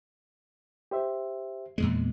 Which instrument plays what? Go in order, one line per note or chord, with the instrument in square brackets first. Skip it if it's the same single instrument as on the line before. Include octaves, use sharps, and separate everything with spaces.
[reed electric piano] G4 C5 E5
[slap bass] E2 A#2 G#3